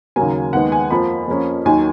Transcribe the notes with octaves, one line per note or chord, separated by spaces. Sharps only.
D#2 C#3 F#3 A#3 G#5
D#2 D#3 G#3 B3 F#5
G#5
F2 F3 A#3 B5
F2 F3 A#3 C#4
D#2 D#3 F#3 G#5